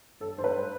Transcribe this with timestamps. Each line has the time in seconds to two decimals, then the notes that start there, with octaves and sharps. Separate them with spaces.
0.20 G2 A4
0.38 G2 C5
0.44 B4